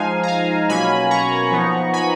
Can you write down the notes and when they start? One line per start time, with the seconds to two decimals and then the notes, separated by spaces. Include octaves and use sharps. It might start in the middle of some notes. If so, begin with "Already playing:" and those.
Already playing: F3 G#3 D#4 F5 G#5
0.23 A#5
0.28 F5 G#5
0.69 B2 F#3 A#3 C#4 G#5 B5
1.11 A#5 C#6
1.52 F3 B3 D#4
1.93 G#5 B5